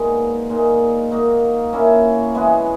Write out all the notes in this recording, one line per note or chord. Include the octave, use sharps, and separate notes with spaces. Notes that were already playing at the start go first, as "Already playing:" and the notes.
Already playing: A#2 G#3 B3 D#4 G#4
A#2 G#3 D#4
A#3 D#4 F#4
A#3 C#4 E4
E3 G#3 B3 F#4